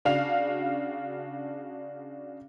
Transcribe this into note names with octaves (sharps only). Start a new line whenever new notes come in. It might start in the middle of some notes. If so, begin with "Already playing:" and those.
C#3 D4 F#4 F5 F7